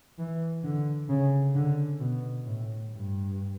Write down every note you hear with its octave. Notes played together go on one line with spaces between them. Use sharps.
E3
D3
C#3
D3
B2
A2
G2